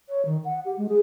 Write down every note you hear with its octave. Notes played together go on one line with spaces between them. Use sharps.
C#5
D#3
F#5
G4
G#3
G#4